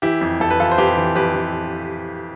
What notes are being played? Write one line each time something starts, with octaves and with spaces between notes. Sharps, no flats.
E3 E4 G4
F2
F2 A4
B4
E3 F4 A4
C5
F2 G4 B4
E3
F2 G4 B4
E3